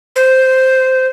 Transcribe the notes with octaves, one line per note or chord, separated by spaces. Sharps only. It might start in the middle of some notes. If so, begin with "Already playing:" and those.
C5